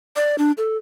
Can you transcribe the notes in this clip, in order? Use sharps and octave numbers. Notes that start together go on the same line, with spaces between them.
D5
D4
A4